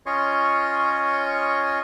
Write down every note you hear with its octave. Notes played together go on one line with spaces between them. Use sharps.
C#4 F4 C#5 D#5 C6 C#6